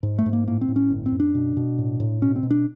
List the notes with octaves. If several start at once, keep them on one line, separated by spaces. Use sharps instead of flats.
G#2
A3
G#2
A#3
A2 A#3
C4
A2
C#4
G1
C4
F#2
D4
B2
B2
A2
A2
B2 C#4
C4
B2
D4